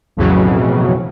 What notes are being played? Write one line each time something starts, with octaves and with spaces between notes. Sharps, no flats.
B1 F2 A2 C#3 E3 F#3